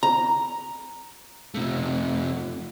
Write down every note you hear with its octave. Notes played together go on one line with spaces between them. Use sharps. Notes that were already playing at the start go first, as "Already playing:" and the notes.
A#5
C3 A3